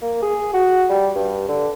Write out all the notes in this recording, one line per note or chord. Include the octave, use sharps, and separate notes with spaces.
A#3
G#4
F#4
G3
G2
D3